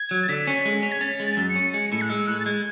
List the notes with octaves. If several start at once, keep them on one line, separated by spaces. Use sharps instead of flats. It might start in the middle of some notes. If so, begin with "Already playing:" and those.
Already playing: G#6
F#3
A6
D3 B6
C#4
G#3
C#4
G#6
C#4 A6
G#3
A6
F#2
C#7
C#4
G#3 C#7
A2 C#7
F#6
G#3 E6
A2 F#6
A6
G#3 G#6